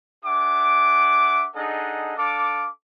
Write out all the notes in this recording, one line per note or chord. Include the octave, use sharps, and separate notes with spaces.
D4 G#4 E5 F#5 D6
D4 D#4 G#4 A4 D#5 F#5
D4 A4 F5 D6